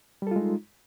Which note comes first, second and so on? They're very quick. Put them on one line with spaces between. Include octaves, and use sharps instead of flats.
G3 A4 F4 G#3 D#4